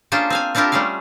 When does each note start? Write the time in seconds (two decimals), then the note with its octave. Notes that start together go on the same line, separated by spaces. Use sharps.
0.12 A#3 C#4 D4 F4 G#4 C5
0.30 C4 F5 G#5
0.55 C4 D4 E4 F4 G4 A#4
0.72 G3 A3 C#4 G#4 F5